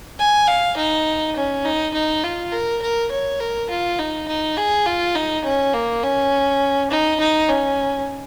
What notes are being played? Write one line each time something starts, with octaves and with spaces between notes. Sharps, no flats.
G#5
F5
D#4
C#4
D#4
D#4
F4
A#4
A#4
C#5
A#4
F4
D#4
D#4
G#4
F4
D#4
C#4
A#3
C#4
D#4
D#4
C#4